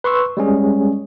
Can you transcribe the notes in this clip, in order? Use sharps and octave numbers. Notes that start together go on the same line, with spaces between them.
B4 C6 C#6 E6
G3 G#3 C#4 G#4